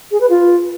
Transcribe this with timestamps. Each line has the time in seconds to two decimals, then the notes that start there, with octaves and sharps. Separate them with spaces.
0.11 G#4
0.20 B4
0.30 F4